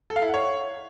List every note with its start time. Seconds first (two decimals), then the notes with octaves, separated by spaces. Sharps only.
0.10 A4
0.16 F5
0.22 E4
0.28 F#5
0.34 C#5